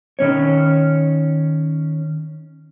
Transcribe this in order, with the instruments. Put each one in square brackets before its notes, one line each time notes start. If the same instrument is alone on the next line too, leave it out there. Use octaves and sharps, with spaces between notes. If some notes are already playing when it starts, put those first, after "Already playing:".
[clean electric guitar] D#3 C#4 C#5